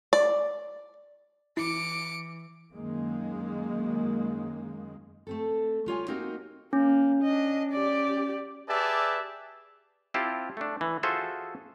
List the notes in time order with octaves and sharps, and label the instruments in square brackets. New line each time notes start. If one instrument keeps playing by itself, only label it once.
[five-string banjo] D5
[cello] E3 [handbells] E4 [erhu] D6 [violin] C#7 D7
[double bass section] F#2 D#3 G#3 A#3
[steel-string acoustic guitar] A3 C4 A4
G3 F4 C#5 G#5
A#3 C4 D#4 F#4 G4 A#4
[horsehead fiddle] A#3 [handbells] C#4
[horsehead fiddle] D4 D#5
G4 D5
[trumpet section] G4 G#4 B4 D5 E5 A5
[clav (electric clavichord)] C4 E4 F4 G4 A5
A3 D4
E3
F4 F#4 G#4 A4 C5 E5